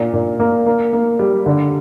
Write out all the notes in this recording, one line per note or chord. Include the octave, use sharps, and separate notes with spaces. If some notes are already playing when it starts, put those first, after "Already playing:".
Already playing: A#2
A#2
A#3
A#3
A#3
G3
D3